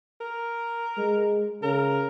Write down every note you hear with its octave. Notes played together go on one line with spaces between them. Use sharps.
A#4
G#3
C#3 A#4